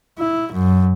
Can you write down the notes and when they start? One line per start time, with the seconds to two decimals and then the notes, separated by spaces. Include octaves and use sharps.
0.18 E4
0.53 F#2